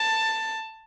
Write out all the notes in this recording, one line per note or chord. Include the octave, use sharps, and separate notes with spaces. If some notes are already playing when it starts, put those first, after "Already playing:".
Already playing: A5